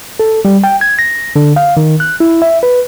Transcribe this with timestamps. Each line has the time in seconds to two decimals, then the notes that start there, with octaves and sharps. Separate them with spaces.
0.20 A4
0.45 G3
0.64 G5
0.81 G#6
0.99 A#6
1.36 D3
1.56 F5
1.77 D#3
2.00 F#6
2.20 E4
2.42 E5
2.63 B4